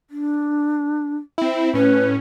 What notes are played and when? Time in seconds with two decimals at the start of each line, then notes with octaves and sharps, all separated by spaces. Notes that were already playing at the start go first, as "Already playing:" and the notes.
0.10 D4
1.38 C4 E4
1.74 A2 C#4 B4